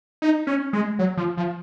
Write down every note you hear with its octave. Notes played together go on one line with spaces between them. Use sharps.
D#4
C#4
G#3
F#3
F3
F3